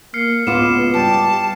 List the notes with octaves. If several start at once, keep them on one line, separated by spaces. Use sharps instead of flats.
A#3 F6 C7 C#7
C#2 B3 F4 D6 F6 E7
G3 G4 A5